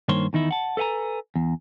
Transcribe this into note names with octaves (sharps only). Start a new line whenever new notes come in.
G2 D#3 A#3 C5 C#5 C6
E2 D#3 D#4 E4
F#5 A5
A4 B4 F5 G#5 A#5
E2